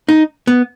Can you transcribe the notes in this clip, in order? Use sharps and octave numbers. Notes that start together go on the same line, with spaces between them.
D#4
B3